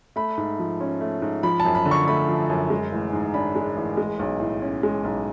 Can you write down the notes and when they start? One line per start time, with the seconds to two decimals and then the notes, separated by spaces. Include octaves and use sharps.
0.16 A3 B5
0.38 G#2
0.59 F3
0.81 C#4
1.01 A3
1.22 G#2
1.43 F3 B5
1.60 A5
1.65 F#2
1.75 B5
1.86 D3
1.91 C#6
2.07 A3 B5
2.28 F3
2.50 F#2
2.70 G#3
2.92 A1
3.13 G#2
3.34 D4 B5
3.55 G#3
3.76 A1
3.97 G#3
4.19 B1
4.40 A2
4.62 C#4
4.83 G#3
5.04 B1